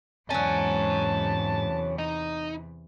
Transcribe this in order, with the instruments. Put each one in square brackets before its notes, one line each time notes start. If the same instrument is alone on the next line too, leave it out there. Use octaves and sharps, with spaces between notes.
[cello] E2 C3 [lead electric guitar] G#2 G#5 [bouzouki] F#3 C#4 [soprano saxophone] A5
[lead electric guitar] D#4